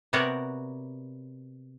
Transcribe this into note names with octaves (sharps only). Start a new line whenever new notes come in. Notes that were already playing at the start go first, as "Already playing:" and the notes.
C3 B3 F#4 A#4 C#5 D5